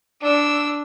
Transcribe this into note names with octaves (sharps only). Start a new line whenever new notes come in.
D4 E6